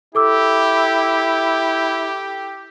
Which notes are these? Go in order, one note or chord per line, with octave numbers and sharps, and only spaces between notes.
E4 G4 A4 D6 E6